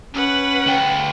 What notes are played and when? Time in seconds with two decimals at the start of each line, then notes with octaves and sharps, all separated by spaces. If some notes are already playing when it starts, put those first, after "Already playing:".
0.14 C#4 B4 F#5
0.66 D2 G5